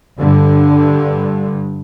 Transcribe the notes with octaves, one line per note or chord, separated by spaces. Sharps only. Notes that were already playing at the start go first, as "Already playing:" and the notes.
G2 D3